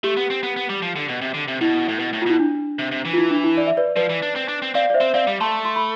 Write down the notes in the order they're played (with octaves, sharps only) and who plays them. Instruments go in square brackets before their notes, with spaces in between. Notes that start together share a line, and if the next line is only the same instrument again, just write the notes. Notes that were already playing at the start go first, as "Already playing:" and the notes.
[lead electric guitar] A3 [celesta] G4
[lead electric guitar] B3
C4
B3
B3
G3
F3
D3
B2
C3
D3
C3
[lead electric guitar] B2 [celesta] E4
[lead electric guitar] A2
B2
A2
[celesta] F4
[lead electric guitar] B2 [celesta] E4
[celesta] D4
[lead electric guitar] C3
C3
E3
[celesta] F4
E4
D4
E4
D5
E5
B4 D5
[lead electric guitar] F3 [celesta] B4 D5
[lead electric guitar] E3
D4
C4
D4
C4
[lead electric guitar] C4 [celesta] D5 F5
[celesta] D5
C5 E5
[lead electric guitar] C4
[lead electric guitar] C4 [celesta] D5 F5
[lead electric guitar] G3
[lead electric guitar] A3 [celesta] A5 C6
[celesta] C6
B5